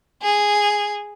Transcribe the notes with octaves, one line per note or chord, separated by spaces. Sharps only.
G#4